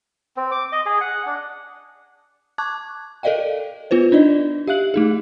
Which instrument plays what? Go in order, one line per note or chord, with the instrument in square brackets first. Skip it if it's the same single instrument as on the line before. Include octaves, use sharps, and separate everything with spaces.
[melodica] C4
D6
D#5
G#4
F#5
D4
[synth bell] A5 C#6 D6 F#6 G#6
A4 A#4 D5 D#5 F5 G5
B3 F4 B4 C5
D4 D#4 D5 D#5
G4 E5 F5 F#6 F#7
A3 D#4 G#4